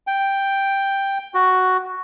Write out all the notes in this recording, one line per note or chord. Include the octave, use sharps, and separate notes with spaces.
G5
F#4